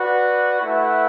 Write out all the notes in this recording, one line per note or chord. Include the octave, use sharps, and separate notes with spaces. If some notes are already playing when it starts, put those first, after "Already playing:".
Already playing: F#4 B4 D5 F#5
A3 E4 B4 F#5